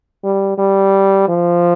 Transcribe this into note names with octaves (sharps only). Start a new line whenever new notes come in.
G3
G3
F3